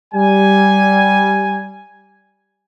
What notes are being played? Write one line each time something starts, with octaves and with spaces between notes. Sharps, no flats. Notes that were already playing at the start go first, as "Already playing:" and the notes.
G3 G#5